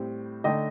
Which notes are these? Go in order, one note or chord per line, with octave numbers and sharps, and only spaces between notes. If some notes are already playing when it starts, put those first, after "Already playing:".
Already playing: A2 G3 C4
D3 A3 D#4 D#5 G5